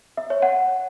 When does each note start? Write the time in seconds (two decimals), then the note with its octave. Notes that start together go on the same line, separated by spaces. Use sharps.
0.17 E5
0.30 C#5
0.42 F#5